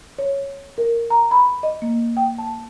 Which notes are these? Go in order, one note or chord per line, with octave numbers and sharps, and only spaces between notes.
C#5
A#4
A#5
B5
D#5
A#3
G5
A5